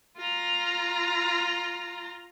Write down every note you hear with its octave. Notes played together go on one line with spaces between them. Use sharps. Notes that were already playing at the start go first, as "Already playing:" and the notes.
F4 A#5